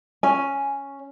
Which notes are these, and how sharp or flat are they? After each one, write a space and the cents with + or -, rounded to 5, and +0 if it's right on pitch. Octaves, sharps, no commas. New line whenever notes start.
C#4 +0 G#5 +0